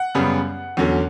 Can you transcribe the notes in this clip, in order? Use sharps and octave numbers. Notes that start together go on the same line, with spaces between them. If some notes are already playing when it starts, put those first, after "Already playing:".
Already playing: F#5
F#2 C#3 G3 B3
E2 D3 F#3 C#4